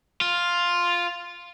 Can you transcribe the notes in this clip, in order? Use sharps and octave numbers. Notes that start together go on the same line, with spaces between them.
F4